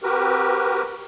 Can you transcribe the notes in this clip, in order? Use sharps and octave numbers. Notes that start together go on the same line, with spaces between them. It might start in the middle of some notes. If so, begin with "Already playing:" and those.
C4 F#4 G4 A#4 B4